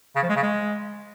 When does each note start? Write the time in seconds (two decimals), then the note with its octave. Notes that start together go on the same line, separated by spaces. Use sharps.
0.16 C#3
0.22 F3
0.29 G#3
0.36 C#3
0.43 G#3